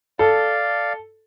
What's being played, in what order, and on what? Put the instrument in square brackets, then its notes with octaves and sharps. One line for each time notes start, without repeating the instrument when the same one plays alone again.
[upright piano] A4 [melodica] D5 F5